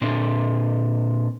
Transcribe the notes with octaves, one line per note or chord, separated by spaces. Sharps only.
A#2 C4 D4